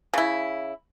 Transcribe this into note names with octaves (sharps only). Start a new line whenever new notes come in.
C#3 E4